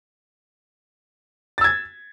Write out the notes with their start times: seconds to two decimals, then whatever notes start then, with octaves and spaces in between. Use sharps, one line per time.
1.58 A6
1.61 E6
1.64 G#6